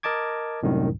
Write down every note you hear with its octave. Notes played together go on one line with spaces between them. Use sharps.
A#4 D#5 A5 D6 G#6
C2 F#2 A2 D#3